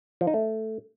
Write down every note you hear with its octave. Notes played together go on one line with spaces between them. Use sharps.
F3
D#4
A3